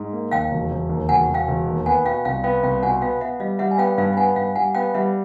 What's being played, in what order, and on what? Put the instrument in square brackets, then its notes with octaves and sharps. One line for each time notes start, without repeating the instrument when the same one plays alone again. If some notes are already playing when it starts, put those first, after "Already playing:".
Already playing: [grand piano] G#2
A#3
[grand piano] D#2 [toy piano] F5 G5
[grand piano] E1
E1
D#2
[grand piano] E1 [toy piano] F#5 G#5
[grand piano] E1
[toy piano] F5 G5
[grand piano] E1
D#2
[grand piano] B3 [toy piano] F#5 G#5
[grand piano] B2 [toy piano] F5 G5
[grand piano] C2 [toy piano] F5 G5
[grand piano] B3 [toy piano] F5 G5
[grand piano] C2 [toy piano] F5 G5
[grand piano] B2 [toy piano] F#5 G#5
[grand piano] B3 [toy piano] F5 G5
[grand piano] B3 [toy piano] E5 F#5
[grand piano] G3 [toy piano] D#5 F5
[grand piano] G3 [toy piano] E5 F#5
[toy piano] G#5
[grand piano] B3 [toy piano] F5 G5
[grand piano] G2 [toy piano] F5 G5
[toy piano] G5
[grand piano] B3 [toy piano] F#5 G#5
[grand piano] G2 [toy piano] F5 G5
[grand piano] G3 [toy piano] F#5 G#5
[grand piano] B3 [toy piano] F5 G5
[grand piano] G3 [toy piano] E5 F#5